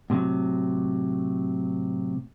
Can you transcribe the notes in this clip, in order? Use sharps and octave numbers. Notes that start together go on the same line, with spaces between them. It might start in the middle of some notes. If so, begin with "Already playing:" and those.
A2 C3 F#3